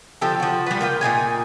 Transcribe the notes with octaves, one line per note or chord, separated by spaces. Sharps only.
D3 F3 G4 A4
F3 F#4
G3 B4
A#3 F4 G5
A#2 C#3 D#4 G#5